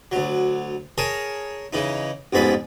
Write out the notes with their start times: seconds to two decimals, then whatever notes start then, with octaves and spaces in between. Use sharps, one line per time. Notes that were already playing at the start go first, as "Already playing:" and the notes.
0.12 D2 F#3
0.98 G#4 A#4 C#5 G#5 A5
1.73 C#3 E3 D#4
2.33 A1 F2 G#2 B3 G#4 B5